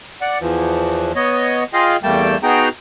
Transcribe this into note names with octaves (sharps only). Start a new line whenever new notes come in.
D5 F#5
E2 E3 F3
B3 C#5 D#5
F4 G#4 D#5 F5 G5
E2 G3 A3 A#3 G5 A5
B3 D#4 F#4 G#4 G5 A#5